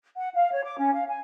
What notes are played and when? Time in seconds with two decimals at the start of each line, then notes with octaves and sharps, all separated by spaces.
0.16 F#5
0.34 F5
0.52 C#5
0.65 D6
0.79 C#4
0.93 F5
1.09 G#5